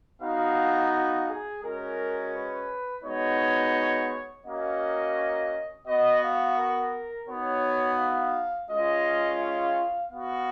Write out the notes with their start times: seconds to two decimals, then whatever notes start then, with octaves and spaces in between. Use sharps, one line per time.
0.21 B3 D#4 F#4 F5
0.92 F5
1.27 G#4
1.62 G#3 C#4 F#4 A#4
2.33 B4
3.04 G#3 B3 D#4 F#4 C#5
4.45 A#3 C#4 F#4 D#5
5.86 B3 F#4 D#5
6.22 F5
6.57 A#4
7.27 B3 D#4 F#4 C#5
7.98 F5
8.69 G#3 C#4 F4 D#5
9.39 F5
10.10 B3 F#4 F5